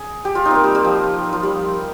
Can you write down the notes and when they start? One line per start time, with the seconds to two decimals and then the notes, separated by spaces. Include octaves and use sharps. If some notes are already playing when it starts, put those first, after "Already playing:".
Already playing: G#4
0.25 G4
0.35 F4
0.45 D#4
0.51 A#3 C4
0.64 G3
0.75 G3
0.84 F3
1.33 F3
1.43 G3